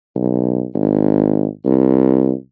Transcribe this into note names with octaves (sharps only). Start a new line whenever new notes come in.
B1
G#1
C2